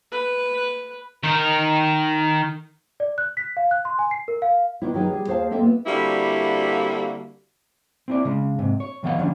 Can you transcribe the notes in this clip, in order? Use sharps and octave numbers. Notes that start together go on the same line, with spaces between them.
B4
D#3 A#4
D5
F#6
B6
F5
F#6
C6
G#5
C7
A#4
F5
D#3 B3 D4 E4
D#3 F#3 D#4 G#4 B4
G3 G#4
D#2 G#4 C5 D#5 F5 A5
A#3 C4 A4 D#5 E5
B3 E5
D3 G3 A#3 C4 E4 F#4
C4 E4 D5
C#3 G#3
G#2 C3
C#5
F2 D#3 B3 F5 F#5
D3 F3 G3 C#4 D4